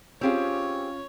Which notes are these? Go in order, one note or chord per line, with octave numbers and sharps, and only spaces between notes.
C4 C#4 F4 G4 G#4 C#5